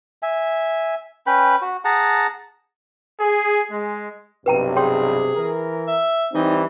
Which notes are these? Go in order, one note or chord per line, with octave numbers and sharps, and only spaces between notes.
E5 G#5
C#4 B4 G5 B5
F#4
G#4 F#5 A5 A#5
G#4
G#3
B1 G2 C3 B4 G5 A#5
G#4 C#5 G5 C6
E3 A#4
E5
E3 G3 C4 D#4